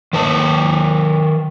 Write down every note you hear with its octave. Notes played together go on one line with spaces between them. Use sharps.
D#3 B4 A5